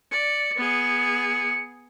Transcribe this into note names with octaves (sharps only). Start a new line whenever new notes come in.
D5 C#7
B3 G#4